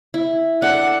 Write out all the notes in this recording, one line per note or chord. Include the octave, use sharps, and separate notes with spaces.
E4
D4 A4 F#5